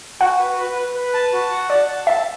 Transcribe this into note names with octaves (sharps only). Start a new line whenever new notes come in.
F#4 F#5
B4
B4
B4
B4
A5
F#4
F#5
D5 A5
A5
E5 A5